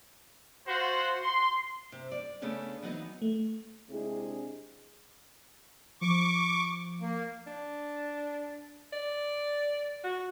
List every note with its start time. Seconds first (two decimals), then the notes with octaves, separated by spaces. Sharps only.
0.67 F4 F#4 C5
1.23 C6
1.92 C3
2.12 D5
2.42 C#3 A3 B3 C#4 D4 G#4
2.83 E3 F#3 B3 D#4 D#5
3.22 A3
3.89 C3 G#3 D4 E4 G#4
6.01 F3 C#6 D6
7.01 A#3
7.47 D4
8.93 D5
10.04 F#4